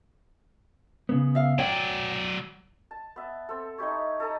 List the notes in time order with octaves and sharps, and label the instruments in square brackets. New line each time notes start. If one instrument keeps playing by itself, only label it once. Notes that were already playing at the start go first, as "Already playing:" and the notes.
[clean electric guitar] C#3 B3
[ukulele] E5 F5
[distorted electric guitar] F#3 D5 [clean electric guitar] C#5 F#5 [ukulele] G5
[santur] A5
B3 E5
C4 A4
D#4 E4 G4 C#5
A4 D#5 A5 A#5